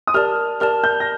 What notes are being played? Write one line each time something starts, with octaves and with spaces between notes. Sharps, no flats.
D#6
G4 A#4 D5 A5 F6
G4 A#4 D5 A5 F6
G6
A#6